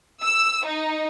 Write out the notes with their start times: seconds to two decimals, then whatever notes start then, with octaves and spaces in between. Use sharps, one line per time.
0.22 E6
0.65 D#4